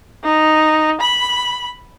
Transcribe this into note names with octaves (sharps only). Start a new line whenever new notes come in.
D#4
B5